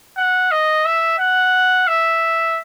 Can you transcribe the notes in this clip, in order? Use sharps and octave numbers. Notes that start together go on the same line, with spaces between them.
F#5
D#5
E5
F#5
E5